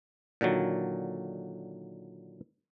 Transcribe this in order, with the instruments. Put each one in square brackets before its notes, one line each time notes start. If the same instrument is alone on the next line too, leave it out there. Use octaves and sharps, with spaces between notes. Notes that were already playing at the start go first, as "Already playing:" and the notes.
[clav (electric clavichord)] A#2 D3 D#3 F#3